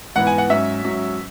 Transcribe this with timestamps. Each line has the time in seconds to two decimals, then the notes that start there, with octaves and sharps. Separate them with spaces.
0.16 G#2 E3 B3 F#5
0.27 G#5
0.38 F#5
0.50 G#2 F#3 C#4 E5
0.83 G#2 F#3 C#4